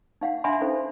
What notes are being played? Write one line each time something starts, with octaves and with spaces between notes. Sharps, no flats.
D#4 F5 F#5
D4 E5 F#5 G#5 B5 C6
C#4 D#4 A4 C5